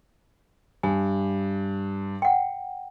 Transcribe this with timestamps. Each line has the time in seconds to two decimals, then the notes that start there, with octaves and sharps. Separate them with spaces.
0.83 G2 G#5
2.22 F#5 G5